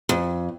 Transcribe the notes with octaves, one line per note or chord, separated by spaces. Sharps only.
F2